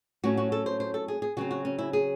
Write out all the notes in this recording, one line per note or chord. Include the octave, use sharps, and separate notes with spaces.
A2 F#3 C#4 F#4
F#4
A4
C5
C5
A4
G#4
G#4
C#3 F#3 C4 F#4
F#4
C#4
E4
G#4